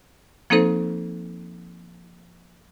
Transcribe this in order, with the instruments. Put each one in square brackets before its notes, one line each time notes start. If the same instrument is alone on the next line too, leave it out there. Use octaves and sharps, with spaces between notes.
[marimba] F3 A#3 C4 D#4 A4 C5